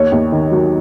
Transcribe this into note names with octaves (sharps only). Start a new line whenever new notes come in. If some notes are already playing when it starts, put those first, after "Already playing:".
Already playing: D#2 C#5
D#2
D#3
F#3